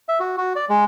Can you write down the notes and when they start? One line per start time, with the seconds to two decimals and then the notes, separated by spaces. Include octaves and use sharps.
0.09 E5
0.20 F#4
0.37 F#4
0.56 D5
0.69 G#3